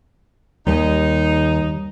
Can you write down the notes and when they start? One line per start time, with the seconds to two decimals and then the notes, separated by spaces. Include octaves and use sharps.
0.67 D#2 D#3 G3 D#4